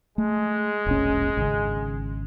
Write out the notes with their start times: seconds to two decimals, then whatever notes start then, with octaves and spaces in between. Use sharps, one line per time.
0.18 G#3 A3
0.86 E1 A#1 C#4
1.37 G#1 C#3